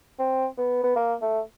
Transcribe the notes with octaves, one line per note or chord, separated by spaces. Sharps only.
C4
B3
B3
A#3
A3